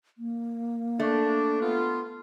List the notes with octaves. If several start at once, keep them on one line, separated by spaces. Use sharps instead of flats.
A#3
A3 D4
B3 F4